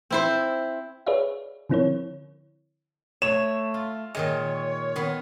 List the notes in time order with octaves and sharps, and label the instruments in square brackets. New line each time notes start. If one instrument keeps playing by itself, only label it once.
[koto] C4 E4 C5
[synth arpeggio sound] G#4 B4 C#5 D5 E5 F5
D3 F3 C4 E4 A#4 C#5
[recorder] A3 [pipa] C#5 [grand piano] E7
[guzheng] F4
[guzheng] A#2 D#3 D#5 [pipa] G#3 [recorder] C#5
[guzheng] D#3 B3